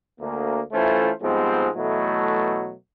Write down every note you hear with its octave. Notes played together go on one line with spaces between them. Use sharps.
D2 A#3
E3 A3 C#4 F4 A4 C5
G#2 F3 G3 G#3 B3 C4
B2 E3 F#3 A3